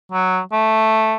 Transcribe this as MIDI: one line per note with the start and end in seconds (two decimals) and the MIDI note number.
0.12 0.39 54
0.52 1.17 57